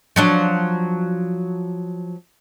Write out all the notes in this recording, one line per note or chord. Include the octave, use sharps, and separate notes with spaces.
F3 F#3 D4